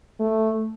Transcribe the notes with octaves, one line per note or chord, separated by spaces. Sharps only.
A3